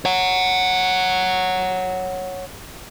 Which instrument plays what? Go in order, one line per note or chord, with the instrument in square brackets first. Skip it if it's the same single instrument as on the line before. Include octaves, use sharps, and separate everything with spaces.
[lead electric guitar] C#5 F#5